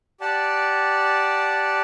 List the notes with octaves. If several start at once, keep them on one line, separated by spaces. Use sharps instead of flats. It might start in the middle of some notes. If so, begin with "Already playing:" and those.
G4 D5 F#5 A5